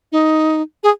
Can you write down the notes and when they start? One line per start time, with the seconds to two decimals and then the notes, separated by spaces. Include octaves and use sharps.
0.12 D#4
0.83 G#4